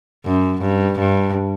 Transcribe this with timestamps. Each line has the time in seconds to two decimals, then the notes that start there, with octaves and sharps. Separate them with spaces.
0.25 F#2
0.62 G2
0.99 G2